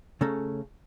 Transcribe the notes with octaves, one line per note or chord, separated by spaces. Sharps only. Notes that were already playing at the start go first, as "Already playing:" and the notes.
C#3 A3 C#4 A4 A#5